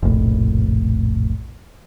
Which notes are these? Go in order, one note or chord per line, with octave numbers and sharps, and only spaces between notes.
F1 A#1 A2